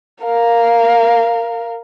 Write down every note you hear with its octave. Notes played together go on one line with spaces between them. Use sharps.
A#4 F5